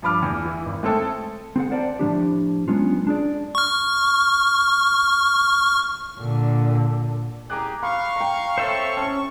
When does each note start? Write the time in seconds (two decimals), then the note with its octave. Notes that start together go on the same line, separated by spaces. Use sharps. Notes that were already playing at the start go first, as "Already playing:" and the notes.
0.02 G2 F3 B5 D6 F6
0.22 E2
0.45 E3
0.66 G#1
0.83 G#3 A3 C4 A4
1.56 C4 G#4 A4 F#5
1.71 A#4 C5 D5 F#5 G5 A5
1.99 A2 F3 D4 G4
2.68 F#3 G#3 B3 C#4 D4 F4
3.07 D4 G#4 D5
3.55 C#6 F6
6.18 A#2 D3
7.50 G4 G#4 A#5 D6 F#6
7.83 F5 B5 C#6
8.16 G5 A#5
8.58 C4 A4 C5 C#5 E5
8.97 C#4 A5